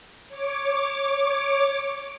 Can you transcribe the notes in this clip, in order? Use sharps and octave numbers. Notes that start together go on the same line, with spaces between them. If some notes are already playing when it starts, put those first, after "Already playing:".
C#5 D6